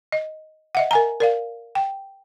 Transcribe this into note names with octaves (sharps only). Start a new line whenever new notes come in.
D#5
D#5 E5 F#5
A#4 G#5 A#5
A#4 D5 F5
G5